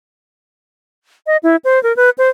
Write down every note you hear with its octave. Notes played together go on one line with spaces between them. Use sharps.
D#5
E4
C5
A#4
B4
C5